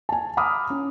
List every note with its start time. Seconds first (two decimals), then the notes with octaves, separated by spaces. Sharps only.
0.09 G#5 A5
0.37 A#5 B5 D6 D#6 F6
0.70 C#4